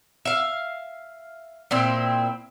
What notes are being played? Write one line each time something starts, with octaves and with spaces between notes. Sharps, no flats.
E5 F5
A#2 C4 E4